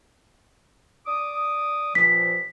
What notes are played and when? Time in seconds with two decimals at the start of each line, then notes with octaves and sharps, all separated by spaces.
1.06 D5 D6 D#6
1.95 G2 A#2 F3 B6